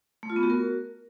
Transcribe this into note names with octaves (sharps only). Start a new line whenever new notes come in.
A3
F4
B3
F#4
A#4